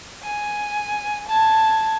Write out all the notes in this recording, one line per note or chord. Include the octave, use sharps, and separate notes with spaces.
G#5
A5 G#6